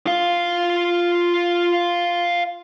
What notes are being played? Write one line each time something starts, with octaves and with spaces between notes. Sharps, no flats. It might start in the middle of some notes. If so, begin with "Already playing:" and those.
F4 F5